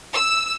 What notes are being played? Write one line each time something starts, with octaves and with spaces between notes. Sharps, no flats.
E6